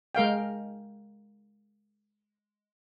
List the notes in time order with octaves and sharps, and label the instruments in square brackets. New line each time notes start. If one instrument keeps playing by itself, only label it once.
[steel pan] G#3 A#4 F5 G5